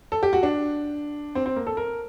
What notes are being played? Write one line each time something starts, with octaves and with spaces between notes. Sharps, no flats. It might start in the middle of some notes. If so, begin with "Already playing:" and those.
A4
G4
F#4
D4
C4
C4
A#3
A4
A#4